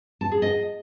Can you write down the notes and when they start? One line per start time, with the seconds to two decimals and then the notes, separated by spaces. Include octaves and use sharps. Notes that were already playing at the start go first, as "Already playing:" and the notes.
0.21 A5
0.31 G#4
0.42 D#5